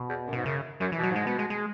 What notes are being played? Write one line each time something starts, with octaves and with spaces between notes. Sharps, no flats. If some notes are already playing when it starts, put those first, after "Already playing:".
Already playing: B2
E2
F#2
G#2 B2
F#2 C#3
F#2 F#3
E3
B2
F#3
G#2 G#3
B2 B3
G#3
G#3